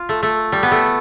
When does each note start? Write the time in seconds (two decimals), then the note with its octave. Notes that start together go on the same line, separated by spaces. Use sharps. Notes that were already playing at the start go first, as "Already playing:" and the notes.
Already playing: F4
0.09 A3
0.23 A3
0.52 G3
0.63 B3
0.72 A3